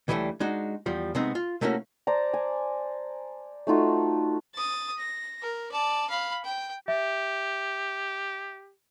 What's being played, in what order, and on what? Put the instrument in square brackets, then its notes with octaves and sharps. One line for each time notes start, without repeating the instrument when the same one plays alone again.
[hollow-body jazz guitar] C#2 E3 F#3 G3 A3 D4
G#3 D4 D#4 F#4
E2 F3 G3
C3 G#3 B3 C4 D#4
F4
C3 A3 A#3 C#4 E4 F#4
[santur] C5 D5 A5 A#5
G#5
A3 D#4 F4 F#4
[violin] D#6 A6
A#6
A#4
D5 A5
F5 B5
G5
[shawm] G4 [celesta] E5